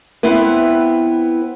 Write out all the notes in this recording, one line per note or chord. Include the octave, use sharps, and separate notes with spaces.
B3 C4 E4 B4